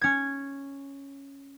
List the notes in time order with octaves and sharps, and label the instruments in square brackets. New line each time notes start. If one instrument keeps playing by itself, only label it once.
[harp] C#4 G#6